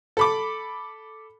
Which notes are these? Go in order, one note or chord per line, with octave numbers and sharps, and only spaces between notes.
A4 B5 D6